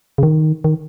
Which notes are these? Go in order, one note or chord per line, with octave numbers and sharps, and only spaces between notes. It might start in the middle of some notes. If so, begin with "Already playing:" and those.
C#3
D#3
D#3